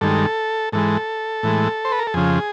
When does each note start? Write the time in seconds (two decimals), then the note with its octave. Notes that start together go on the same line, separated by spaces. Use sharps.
0.01 G2 D#3 G#3 A4
0.72 G#2 E3 G#3 A4
1.43 A2 E3 G#3
1.85 C5
1.92 B4
1.99 A#4
2.07 A4
2.14 F2 C#3 F3 G#4